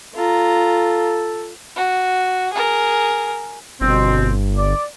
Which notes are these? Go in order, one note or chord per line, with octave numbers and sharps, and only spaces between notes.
F4 A4 A#5
F#4
G#4 A#4
G1 B2 C4
D5